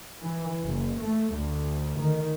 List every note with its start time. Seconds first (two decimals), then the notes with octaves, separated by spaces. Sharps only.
0.22 E3
0.63 F#1
1.02 A3
1.35 D2
2.00 D#3